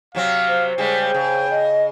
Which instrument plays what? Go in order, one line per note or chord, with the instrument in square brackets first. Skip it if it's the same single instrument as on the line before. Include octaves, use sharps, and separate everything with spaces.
[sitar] C3 F#3 C4 [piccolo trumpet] F5
[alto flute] C5
[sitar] C#3 G3 G#3 [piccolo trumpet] G5
[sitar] C#3
[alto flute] D#5